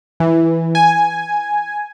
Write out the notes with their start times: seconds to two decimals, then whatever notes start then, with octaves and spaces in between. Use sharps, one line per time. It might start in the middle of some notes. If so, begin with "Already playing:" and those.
0.20 E3
0.75 G#5